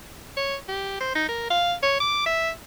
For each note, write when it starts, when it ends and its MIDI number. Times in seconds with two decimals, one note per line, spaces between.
0.37 0.56 73
0.69 0.98 67
1.01 1.13 72
1.16 1.24 63
1.29 1.47 70
1.51 1.74 77
1.83 1.95 73
2.00 2.24 86
2.27 2.50 76